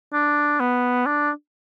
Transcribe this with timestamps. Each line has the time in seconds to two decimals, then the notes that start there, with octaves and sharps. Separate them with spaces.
0.13 D4
0.60 B3
1.06 D4